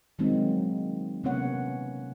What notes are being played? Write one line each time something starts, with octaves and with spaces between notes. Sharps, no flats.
D#3 F#3 G#3 A#3 C4 D#4
C3 A#3 B3 C#4 C#5 F#5